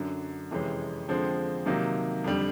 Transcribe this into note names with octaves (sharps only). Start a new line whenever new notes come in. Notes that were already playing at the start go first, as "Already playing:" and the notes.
Already playing: F#2 D3 F#3
F2 C3 E3 G#3 C#4
F2 D3 F3 G#3 C4
C3 D#3 F#3 A#3 D#4
F2 D3 G3